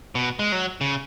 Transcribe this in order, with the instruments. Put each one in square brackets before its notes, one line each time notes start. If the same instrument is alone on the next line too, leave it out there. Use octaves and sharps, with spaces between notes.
[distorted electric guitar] B2
G#3
F#3
C#3